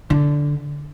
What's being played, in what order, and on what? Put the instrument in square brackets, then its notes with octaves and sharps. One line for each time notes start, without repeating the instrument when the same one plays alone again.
[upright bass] D3